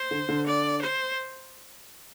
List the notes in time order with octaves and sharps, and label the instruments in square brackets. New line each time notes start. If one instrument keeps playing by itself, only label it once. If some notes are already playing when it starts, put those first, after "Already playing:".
Already playing: [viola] C5
[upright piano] D3
D3
[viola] D5
C5